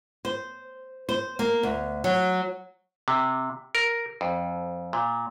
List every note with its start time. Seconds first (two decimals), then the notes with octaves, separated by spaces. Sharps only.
0.25 C5
1.09 C5
1.39 A#3
1.63 D2
2.04 F#3
3.08 C3
3.75 A#4
4.21 F2
4.93 A#2